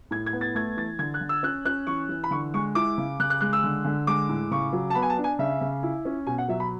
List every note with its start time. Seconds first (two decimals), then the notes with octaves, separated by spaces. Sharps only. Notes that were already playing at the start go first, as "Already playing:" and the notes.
0.11 A2 G#6
0.26 G#6
0.33 B3
0.41 A6
0.55 A3 G#6
0.77 E3 A6
0.99 D3 G#6
1.14 F#6
1.21 D3
1.29 E6
1.43 C#4 F#6
1.65 C#4 F#6
1.87 E3 C#6
2.09 E3
2.24 B5
2.31 D3 C#6
2.54 G#3 C#6
2.75 E4 D6
2.98 C#3
3.20 C#3 F#6
3.30 F#6
3.41 G#3 F#6
3.53 E6
3.64 D3
3.85 D3
4.07 G#3 D6
4.29 A2
4.51 C#3 C#6
4.73 F#3
4.90 A5
4.95 B3 B5
5.02 G#5
5.10 A5
5.18 D4
5.24 G#5
5.39 C#3 E5
5.61 C#3
5.83 E4
6.05 C#4
6.27 B2 G#5
6.38 F#5
6.48 F#3 E5
6.60 B5